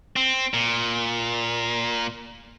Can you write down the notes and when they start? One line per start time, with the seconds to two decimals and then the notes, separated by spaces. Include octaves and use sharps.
0.16 C4
0.54 A#2